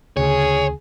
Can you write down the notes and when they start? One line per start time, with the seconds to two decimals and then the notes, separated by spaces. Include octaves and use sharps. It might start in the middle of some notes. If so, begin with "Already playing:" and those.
0.17 D2 C#3 G#4 C#5